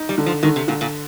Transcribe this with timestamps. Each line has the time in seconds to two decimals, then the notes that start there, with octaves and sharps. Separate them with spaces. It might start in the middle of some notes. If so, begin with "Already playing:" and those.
Already playing: D#4
0.09 G3
0.18 D3
0.26 F3
0.43 D3 D#3
0.56 C3
0.68 A#2 D3
0.81 A#2